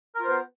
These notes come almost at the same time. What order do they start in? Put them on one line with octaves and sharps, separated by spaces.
A#4 F4 C5 B3